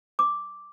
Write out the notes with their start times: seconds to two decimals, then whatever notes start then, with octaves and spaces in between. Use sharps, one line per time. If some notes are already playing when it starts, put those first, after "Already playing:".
0.19 D6